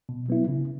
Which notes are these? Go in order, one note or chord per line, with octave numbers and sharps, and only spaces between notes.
B2
F#3 B3 E4
C#3